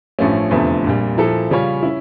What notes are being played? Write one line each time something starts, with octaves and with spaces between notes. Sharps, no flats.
A1 G2 F3 A3 C#4
F1 E2 D3 F3 A3
A#1 A#2 G3
A#2 F3 A#3 E4 A4
C#3 G3 C#4 F4 C#5
C#4 E4